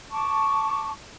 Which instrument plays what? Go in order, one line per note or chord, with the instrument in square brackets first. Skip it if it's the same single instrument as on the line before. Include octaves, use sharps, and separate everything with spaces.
[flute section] A5 C#6 D6